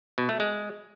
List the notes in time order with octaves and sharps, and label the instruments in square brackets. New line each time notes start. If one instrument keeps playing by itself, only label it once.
[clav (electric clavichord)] B2
A3
G#3